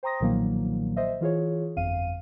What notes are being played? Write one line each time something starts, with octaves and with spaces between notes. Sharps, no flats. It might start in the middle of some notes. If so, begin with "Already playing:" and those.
C5 G5 A#5 C6 D#6 A#6
B1 A#2 D#3 F3 F#3 A#3
C5 D#5 E5
E3 F4 G#4 C#5
G1 F2 F5 D#7